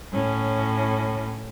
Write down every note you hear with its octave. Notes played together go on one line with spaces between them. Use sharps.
A2 C#4